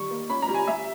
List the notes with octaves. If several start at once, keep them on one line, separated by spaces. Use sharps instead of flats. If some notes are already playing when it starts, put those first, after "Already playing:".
Already playing: D#3 G3 C#6
A#3
C#4 B5
A#5
G3
G#5
G3 E5